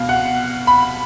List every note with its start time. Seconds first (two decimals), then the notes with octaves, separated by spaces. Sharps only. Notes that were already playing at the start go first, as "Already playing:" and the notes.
Already playing: B2 F5
0.09 F#5
0.67 B5